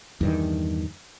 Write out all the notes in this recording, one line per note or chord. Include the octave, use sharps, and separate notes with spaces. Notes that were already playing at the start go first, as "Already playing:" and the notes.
E2 G2 D#3